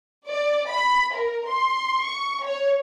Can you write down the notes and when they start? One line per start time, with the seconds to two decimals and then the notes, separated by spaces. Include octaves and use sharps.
0.27 D5
0.69 B5
1.13 A#4
1.48 C6
2.04 C#6
2.44 C#5